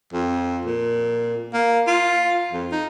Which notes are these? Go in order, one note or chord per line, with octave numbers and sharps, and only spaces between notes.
F2
A#2
A#3
F4
F2
D#4